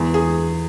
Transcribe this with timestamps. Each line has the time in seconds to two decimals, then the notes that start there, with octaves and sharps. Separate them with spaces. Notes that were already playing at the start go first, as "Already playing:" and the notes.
Already playing: E2
0.14 G#4